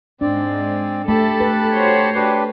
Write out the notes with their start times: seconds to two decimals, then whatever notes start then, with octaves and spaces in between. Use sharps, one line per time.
0.21 G#2 G#3 C4 D4 D5
1.08 A3 G4 A4 A5 B5
1.40 B4
1.73 F#4 C5 C#5
2.15 D4 G4 B4